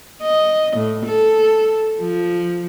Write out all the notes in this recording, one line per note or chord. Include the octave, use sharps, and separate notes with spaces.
D#5
A2
A4
F3